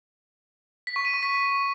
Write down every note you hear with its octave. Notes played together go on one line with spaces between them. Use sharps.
B6
C#6
D#7
C#6
B6